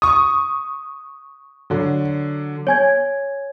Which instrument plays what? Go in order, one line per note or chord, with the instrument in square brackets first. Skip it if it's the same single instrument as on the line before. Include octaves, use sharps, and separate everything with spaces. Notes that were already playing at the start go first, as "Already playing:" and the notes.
[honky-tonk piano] C#6 D#6
[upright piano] D3 F#3
[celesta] C#5 G#5 G#6